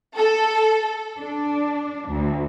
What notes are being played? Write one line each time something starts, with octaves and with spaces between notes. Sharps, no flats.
A4
D4
D2